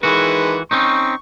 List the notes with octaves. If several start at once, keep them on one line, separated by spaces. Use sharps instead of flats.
D#3 E3 G#3 F#4 B4
C4 C#4 D#4 C#6